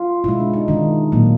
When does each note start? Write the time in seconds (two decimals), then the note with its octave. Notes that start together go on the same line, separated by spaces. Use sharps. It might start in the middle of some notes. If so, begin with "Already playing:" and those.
Already playing: F4
0.24 B2 G#3 E4
0.40 D4
0.53 D#4
0.68 D#3 G#3 D4
1.12 A#2 F#3 A#3